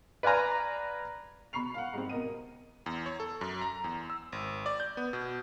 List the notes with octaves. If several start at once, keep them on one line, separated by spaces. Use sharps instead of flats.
B4 D5 F5 G#5 A#5
B2 B5 C#6 C7 F7
F5 F#5
G#2 G3 C4
B2 A#4 D#5 D#7
E2
C#5
A4
F#2
A#5
E2
E6
G#1
D5
G6
B3
B2